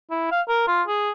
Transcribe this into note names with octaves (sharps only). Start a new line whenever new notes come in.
E4
F5
A#4
F4
G#4